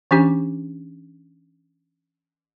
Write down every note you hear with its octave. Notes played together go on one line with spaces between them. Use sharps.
E3 C#4 D4 G4